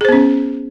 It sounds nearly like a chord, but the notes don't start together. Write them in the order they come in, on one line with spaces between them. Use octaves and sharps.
G#4 C5 B3 C#4